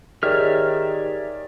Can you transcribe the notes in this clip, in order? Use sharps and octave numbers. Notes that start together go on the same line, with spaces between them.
D#3 G4 G#4 C#5 D5 E5 F6